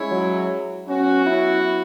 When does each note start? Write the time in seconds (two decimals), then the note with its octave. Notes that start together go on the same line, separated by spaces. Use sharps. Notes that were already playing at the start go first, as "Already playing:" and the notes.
Already playing: G#3 C#4 E4 C#5
0.11 F#3
0.87 F#3 B3 C#4 F#4
1.26 E4